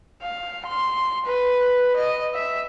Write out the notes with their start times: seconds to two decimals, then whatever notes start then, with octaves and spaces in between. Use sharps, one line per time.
0.22 F5
0.66 C6
1.26 B4
1.96 D#5
2.35 E5